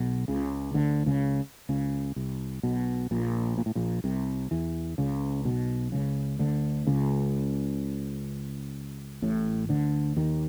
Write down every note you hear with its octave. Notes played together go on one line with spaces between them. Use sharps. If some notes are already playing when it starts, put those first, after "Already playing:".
Already playing: B1 B2
C#2 C#3
D2 D3
C#2 C#3
C#2 C#3
C2 C3
B1 B2
A#1 A#2
A#2
A2
A#1 A#2
C2 C3
E2 E3
C#2 C#3
B1 B2
C#2 C#3
D2 D3
C#2 C#3
A1 A2
D2 D3
D#2 D#3